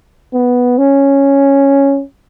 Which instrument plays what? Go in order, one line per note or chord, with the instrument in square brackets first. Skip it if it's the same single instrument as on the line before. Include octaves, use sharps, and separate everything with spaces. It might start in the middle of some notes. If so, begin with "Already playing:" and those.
[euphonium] B3
C#4